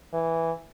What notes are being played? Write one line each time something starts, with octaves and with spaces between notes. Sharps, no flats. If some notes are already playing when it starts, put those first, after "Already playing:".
E3